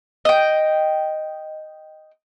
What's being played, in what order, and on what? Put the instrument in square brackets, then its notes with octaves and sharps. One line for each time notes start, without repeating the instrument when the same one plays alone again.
[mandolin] D#5 G5